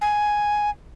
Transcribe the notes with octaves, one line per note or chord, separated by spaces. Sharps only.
G#5